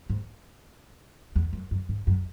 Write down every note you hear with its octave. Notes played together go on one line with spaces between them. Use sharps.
G#2
E2
F#2
F#2
G#2
F#2